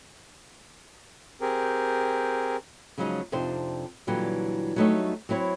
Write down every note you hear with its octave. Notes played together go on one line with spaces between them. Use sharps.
C4 G4 G#4 A#4
C#3 F3 F#3 G#3 C4 D#4
F2 C3 D4 D#4 C5
A#2 D3 E3 F#3 G3
F#3 G3 A3 D#4 C#5 E5
F#3 C4 E4 C#5